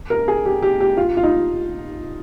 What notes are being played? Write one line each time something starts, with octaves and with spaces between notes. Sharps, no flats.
A#4
G#4
G4
G4
G4
F4
F4
D#4